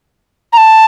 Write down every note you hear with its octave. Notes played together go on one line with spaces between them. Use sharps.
A#5
A5